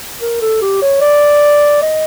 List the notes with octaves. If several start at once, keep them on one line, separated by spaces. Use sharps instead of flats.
A#4
A4
G4
C#5
D5
D#5